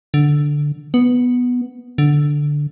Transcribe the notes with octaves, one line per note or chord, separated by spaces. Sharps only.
D3
B3
D3